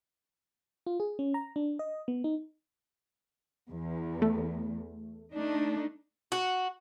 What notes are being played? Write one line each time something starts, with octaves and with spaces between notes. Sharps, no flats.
F4
G#4
C#4
A#5
D4
D#5
B3
D#4
E2
A3
A3 D4 D#4
F#4